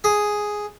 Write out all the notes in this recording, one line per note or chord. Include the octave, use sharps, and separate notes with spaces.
G#4